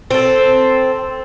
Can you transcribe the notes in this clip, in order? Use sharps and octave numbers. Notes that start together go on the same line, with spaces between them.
C4 A4